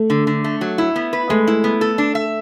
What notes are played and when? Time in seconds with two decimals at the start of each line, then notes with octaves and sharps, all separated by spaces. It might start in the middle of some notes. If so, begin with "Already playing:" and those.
Already playing: A3
0.10 D3
0.27 D3
0.44 A3
0.61 F#3
0.78 E4
0.96 B3
1.13 B4
1.29 G#3 A3
1.47 E4
1.64 B3
1.81 A4
1.98 D4
2.15 E5